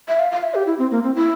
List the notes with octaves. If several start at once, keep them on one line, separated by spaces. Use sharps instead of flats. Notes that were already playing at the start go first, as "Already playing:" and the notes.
E5
F5
F5
E5
G4
E4
C4
A#3
C4
E4